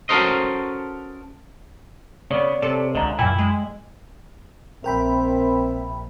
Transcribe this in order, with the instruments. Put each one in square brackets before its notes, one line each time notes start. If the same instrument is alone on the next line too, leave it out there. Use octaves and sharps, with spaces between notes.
[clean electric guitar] C#4 F#4 A4 A#4 C5 D#5
[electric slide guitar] C#3 B3 [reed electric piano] C#5 D5
[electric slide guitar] C3 [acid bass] A4
[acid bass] C#2 [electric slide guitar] D3 [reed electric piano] D#5 A#5
[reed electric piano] F#2 G5 G#5 [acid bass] A#2 [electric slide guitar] E4
[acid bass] G#3
[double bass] A#1 [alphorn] C4 [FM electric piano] A#4 G5 B5 [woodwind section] E5